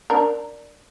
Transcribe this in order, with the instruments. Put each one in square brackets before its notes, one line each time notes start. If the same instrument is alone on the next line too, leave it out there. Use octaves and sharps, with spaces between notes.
[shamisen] D4 A#4